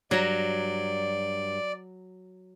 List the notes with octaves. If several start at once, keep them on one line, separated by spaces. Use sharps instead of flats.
G2 F#3 D5 A#5